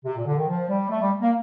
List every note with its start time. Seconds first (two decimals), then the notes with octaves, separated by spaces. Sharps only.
0.05 C3
0.16 A#2
0.25 D3
0.36 D#3
0.48 F3
0.69 G3
0.89 A3
1.01 G3
1.21 A#3